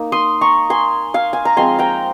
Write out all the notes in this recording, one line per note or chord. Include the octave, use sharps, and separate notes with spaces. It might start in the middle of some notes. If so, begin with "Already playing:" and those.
Already playing: A#3 D#4
C6 D#6
A#5 C#6
G#5 C6
F5 G#5
G#5
A#5
F3 G#3 C4 G#5 C6
G5 A#5